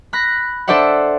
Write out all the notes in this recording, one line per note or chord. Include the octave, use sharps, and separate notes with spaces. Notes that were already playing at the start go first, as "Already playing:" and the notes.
B5 F#6 A#6
D4 A4 C5 D5 E5 F#5